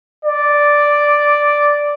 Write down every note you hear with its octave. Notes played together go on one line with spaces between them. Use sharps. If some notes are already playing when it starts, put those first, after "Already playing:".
D5